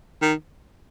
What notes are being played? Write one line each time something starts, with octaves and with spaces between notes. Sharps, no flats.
D#3